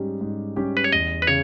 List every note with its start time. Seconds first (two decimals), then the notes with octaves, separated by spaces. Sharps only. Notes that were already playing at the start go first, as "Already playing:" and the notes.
Already playing: G#2 G3 C#4 G4
0.21 G#2
0.56 G3 C#4 G4
0.77 B4
0.84 C#5
0.92 E2 D#5
1.22 B4
1.27 C#3 C#5